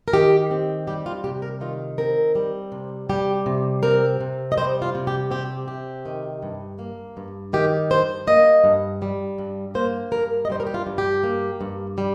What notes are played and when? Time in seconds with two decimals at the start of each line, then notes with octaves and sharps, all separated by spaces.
0.08 A#4
0.13 D#3 G4
0.51 C4
0.87 G3 G4
1.06 F4
1.24 C3 G4
1.42 A#4
1.61 D#3 F4
1.98 C4 A#4
2.35 G3
2.72 C3
3.09 G3 G4
3.46 C3
3.83 C4 A#4
4.20 C3
4.52 D#5
4.57 G3 C5
4.82 F4
4.95 C3
5.07 G4
5.31 C4 G4
5.68 C3 G4
6.06 D#3
6.43 G2
6.79 A#3
7.17 G2
7.53 D#3 G4
7.90 G2 C5
8.27 A#3 D#5
8.64 G2
9.02 G3
9.38 G2
9.75 A#3 C5
10.12 G2 A#4
10.45 D#5
10.50 G3 C5
10.60 A#4
10.67 G4
10.74 F4
10.87 G2
10.98 G4
11.24 A#3
11.61 G2
11.98 G3